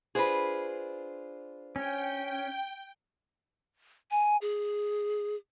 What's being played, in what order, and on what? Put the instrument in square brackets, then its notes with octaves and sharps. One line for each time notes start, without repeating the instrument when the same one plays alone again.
[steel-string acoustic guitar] D4 F4 C5 [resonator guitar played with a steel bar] G#4 B4
[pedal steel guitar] C#4 [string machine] G5
[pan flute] G#5
G#4